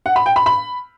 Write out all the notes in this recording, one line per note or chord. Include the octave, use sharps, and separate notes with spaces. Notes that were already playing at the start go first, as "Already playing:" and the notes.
F#5
B5
G5
B5
B5